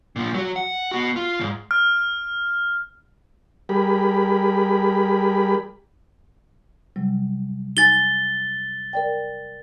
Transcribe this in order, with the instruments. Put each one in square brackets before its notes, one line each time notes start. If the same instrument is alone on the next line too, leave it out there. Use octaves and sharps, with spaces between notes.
[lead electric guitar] A#2 F3
F#3 F#4
F#5
B3 F#4
F4
D#2 G#2
[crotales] F6
[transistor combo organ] G3 G4 G#4 A#4 B5
[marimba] C3 F#3 G3
[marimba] D#4 G#5 [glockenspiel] A6 G7
[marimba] A#4 D5 G5